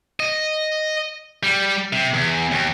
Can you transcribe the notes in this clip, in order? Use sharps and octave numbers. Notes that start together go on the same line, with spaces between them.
D#5
G3
C3
E2
D#2